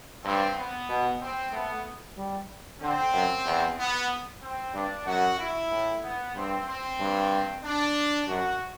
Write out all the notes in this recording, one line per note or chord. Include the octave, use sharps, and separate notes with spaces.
G2 C4
B3
B2
C4
A3 B3
G3
D3 C4
F#2
E2
B3
C4
G2 D4
F#2 F#4
E4
A2
B3
G2 C4
C4
G2
D4
F#2 F#4